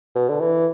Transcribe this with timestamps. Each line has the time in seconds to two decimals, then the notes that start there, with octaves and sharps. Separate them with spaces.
0.15 B2
0.29 D3
0.40 E3